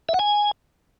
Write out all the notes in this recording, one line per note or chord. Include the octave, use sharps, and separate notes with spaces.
E5
F#5
G#5